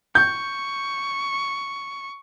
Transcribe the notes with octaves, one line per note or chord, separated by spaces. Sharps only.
C#6 G6